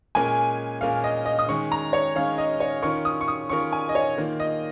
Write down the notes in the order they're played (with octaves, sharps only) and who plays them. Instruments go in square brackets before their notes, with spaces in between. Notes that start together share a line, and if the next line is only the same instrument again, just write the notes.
[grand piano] A#2 G#3 C#4 A#4 [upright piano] G#5
[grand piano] A#2 G#3 C#4 A#4 [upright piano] F5
[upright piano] D#5
D#5
D#6
[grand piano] D#3 G#3 C#4 [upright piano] C#6
[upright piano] A#5
C#5
[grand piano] D#3 G#3 C#4 [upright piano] F5
[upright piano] D#5
C#5
[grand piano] D#3 C#4 F4 A#4 [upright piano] C#6
[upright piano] D#6
C#6
D#6
[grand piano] D#3 C#4 F4 A#4 [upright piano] C#6
[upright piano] G#5
D#5
C#5
[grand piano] D#3 A#3 F4
[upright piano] D#5